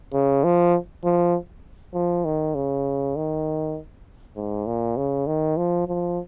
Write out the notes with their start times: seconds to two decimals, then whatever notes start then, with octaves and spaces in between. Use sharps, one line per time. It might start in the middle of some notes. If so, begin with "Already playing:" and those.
0.13 C#3
0.44 F3
1.04 F3
1.94 F3
2.25 D#3
2.55 C#3
3.16 D#3
4.36 G#2
4.67 A#2
4.97 C#3
5.27 D#3
5.57 F3
5.87 F3